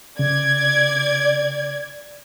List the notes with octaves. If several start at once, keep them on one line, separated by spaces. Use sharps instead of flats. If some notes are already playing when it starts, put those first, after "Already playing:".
C#3 D5 G#6